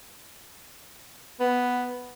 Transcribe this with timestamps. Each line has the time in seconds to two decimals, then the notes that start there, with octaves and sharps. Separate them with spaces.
1.40 B3